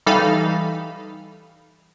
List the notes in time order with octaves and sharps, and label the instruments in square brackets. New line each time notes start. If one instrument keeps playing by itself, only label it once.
[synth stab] E3 G3 D#4 A4 F5 B5